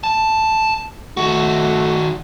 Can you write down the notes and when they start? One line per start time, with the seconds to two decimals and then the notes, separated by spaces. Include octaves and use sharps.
0.04 A5
1.17 D#3 A3 F#4